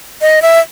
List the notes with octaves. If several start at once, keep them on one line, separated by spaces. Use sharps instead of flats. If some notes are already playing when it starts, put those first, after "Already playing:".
D#5
E5